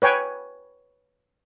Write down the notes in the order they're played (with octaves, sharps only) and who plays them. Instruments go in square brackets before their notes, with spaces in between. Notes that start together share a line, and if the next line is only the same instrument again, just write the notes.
[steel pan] B4 C#5 G5 G#5